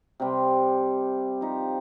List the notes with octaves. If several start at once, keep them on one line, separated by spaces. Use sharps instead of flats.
C3 G3 C4 G4
F3 D#4 G4